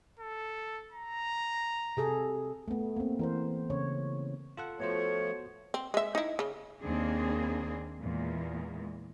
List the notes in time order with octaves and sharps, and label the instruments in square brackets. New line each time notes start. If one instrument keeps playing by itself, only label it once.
[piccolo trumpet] A4
A#5
[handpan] C3 G#4 A4
A3 B3
A#3 C4
E3 A#4 C5
C#3 C#5
[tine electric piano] F4 A4 F#5
[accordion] F3 A3 [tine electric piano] B3 F#4 C5 [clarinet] C#5
[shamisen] C4
G#3 E5
D#4 E4
C#3
[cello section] D#2 A#3 C4 D4 G#4
E2 A#2 G#3